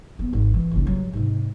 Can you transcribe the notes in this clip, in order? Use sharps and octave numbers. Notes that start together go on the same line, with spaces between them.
B3
G#1
E3
F#1 B1
G2 F#3
G#2 C3